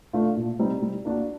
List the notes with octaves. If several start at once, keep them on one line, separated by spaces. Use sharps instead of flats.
A3 D4 F4
A#2
G3 C4 D#4
G3
A#3 D4 F#4